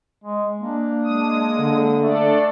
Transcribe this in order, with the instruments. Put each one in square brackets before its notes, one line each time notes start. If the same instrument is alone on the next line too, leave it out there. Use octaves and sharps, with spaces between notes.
[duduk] G#3
[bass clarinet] A#3 [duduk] D4
[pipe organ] G#3 D#6
[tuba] D3
[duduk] A3 [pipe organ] D4 A4 D5